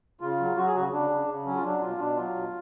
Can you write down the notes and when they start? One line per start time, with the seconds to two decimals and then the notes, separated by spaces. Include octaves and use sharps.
0.21 C#3 F4
0.40 F#3
0.57 F#3 F#4
0.66 G#4
0.75 C#3 F#4
0.93 C#3 D4
1.10 C#3
1.28 C#3
1.45 F#3 C#4
1.57 F4
1.63 F#3 D4
1.82 B2 F4
1.99 B2 D4
2.16 F#3 F4
2.35 B2